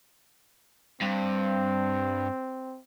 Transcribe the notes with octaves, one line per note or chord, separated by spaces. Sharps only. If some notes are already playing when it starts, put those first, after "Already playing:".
G2 C4